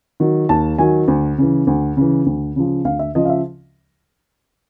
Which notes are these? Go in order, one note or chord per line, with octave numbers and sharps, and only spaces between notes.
D#3 F#3
D#2 A5
D#3 F#3 G#5
D2
C#3 E3
D2
C#3 E3
D2
C#3 F3
D2 F5
E5
C#3 F3 D#5
F5
E5